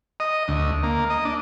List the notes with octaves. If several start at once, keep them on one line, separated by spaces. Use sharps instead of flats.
D#5
D2
A#3
D#5
D4